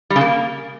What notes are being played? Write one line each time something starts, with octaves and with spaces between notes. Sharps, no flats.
G3
C#3
A#3